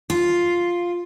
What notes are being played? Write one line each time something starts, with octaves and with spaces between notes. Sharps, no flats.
F4